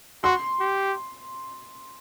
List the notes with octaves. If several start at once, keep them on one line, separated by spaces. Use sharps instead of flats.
F#4 C6
G4